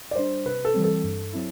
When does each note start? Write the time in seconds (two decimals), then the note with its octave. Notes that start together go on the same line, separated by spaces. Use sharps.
0.11 D5
0.15 G3 D4 C5
0.45 C3 B4
0.65 A4
0.74 E3 G3 C4
0.84 A4
1.04 G2
1.33 F#3 C4 E4